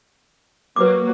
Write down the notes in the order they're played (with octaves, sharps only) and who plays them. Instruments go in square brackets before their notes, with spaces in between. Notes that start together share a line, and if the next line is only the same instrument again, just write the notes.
[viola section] F#3 A#3 [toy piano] B4 D6